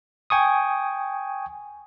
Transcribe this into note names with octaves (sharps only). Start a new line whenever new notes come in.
G5 G#5 C#6 D#6